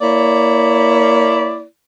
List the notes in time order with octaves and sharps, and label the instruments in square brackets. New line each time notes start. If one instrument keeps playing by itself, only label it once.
[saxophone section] A#3 E4 C#5 D5